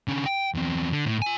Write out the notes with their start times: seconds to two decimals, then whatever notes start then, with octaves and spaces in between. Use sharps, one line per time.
0.08 D3 C#4
0.26 G5
0.55 E2 C4
0.92 D3
1.05 A2
1.22 F4 G#5